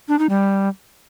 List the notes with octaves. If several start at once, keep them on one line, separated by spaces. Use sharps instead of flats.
D4
D#4
G3